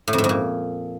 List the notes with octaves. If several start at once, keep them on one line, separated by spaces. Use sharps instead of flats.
A2
F2
G#2
F2
A#2